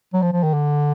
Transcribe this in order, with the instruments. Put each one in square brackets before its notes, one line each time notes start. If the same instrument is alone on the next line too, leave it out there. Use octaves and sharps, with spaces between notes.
[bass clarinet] F#3
F3
F3
D#3
D3